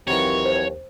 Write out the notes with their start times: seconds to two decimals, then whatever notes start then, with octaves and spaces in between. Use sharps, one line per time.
0.08 D#2 E3 F#3 C4 C#5
0.45 C5